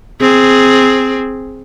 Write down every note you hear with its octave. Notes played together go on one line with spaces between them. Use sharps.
C4 G#4